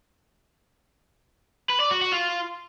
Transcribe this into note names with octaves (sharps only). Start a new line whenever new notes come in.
B4
D5
F#4
F#4
F4